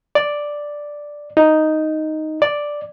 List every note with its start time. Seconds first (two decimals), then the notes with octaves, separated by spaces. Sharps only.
0.15 D5
1.37 D#4
2.42 D5